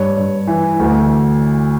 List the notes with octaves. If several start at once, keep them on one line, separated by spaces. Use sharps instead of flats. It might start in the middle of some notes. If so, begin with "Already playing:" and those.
Already playing: G2 C#5
G2
E3
D2